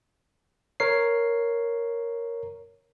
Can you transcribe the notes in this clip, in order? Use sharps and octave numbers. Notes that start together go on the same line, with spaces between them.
A#4 C#5 C7